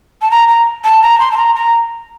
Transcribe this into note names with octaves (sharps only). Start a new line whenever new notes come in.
A5
A#5
A#5
A5
A#5
C6
A5
A#5
A#5